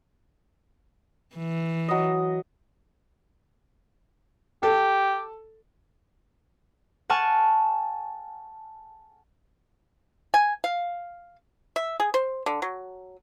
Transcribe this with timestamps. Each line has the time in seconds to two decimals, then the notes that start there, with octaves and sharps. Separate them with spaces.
1.36 E3
1.88 F#3 D#5
4.63 G4 A4
7.10 F#5 G#5 A5 C#6 F6
10.34 G#5
10.64 F5
11.76 E5
12.00 G#4
12.14 C5
12.46 D3
12.62 F#3